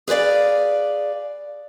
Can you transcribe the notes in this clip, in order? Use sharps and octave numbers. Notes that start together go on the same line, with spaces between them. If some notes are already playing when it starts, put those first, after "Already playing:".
G#4 B4 C5 D5 F5